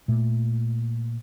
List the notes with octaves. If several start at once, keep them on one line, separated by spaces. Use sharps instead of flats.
A#2 A3